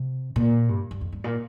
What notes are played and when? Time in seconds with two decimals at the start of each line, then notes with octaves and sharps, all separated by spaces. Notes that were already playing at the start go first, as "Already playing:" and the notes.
Already playing: C3
0.36 A#2
0.69 G2
0.91 G2
1.01 F2
1.12 G2
1.24 A#2